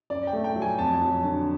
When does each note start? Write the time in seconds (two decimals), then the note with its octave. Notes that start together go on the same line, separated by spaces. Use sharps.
0.10 F#2 D5
0.27 G5
0.33 A3
0.44 G5
0.56 F#3
0.62 G#5
0.78 F2 A5
1.01 F#3
1.24 D3